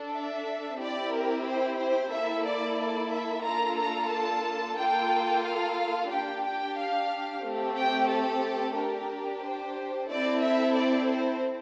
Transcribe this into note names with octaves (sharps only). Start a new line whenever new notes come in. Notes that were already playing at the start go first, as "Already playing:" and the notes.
Already playing: D4 A4
E5
C4 E4 G4 D5
A#4
C5
C5
A#3 E4 A4 E5
D5
D5
E5
A#3 D4 F4 A4 A#5
A#5
A5
A#3 F4 A4 G5
F5
D4 G4 G5
G5
F5
A3 C4 G4
G5
A4
D4 G4 A#4
C5
C4 E4 A4 D5
E5
D5
C5